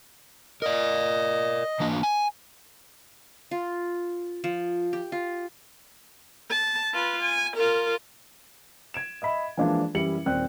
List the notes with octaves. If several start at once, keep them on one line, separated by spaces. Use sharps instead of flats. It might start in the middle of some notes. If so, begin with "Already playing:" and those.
A#4 D5 D#5
E3 A#3 D4
G#5
F4
F3
G4
F4
A5
F4 B4
G#5
F4 A#4
G#6 D7 E7
D#5 E5 B5
E3 F3 G#3 A#3 D4 F4
F#2 E3 G3 E4 C#7 F#7
D#1 C4 D5 G5 F#6